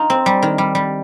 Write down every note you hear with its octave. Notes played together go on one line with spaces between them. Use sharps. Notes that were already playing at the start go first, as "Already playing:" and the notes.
Already playing: D#4 F4
C4
G3
D#3
G3
G3